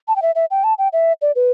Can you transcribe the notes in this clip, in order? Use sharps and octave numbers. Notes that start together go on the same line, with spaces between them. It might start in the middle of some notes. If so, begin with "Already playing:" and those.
A5
G5
E5
E5
G5
A5
G5
E5
D5
B4